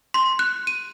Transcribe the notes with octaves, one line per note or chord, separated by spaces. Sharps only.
C6
F#6
D#7